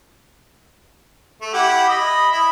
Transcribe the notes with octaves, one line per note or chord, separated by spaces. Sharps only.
A3
E4 G4 F#5
D#5 B5
E4 B5